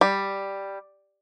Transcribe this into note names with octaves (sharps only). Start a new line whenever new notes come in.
G3